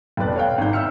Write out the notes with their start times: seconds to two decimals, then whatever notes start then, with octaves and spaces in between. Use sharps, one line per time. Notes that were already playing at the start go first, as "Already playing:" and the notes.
0.17 F1 F2 B2 B4 D5 F#6
0.36 C#5 F5 G5
0.58 G#1 D#4 G6
0.73 E5 E6 F6 C#7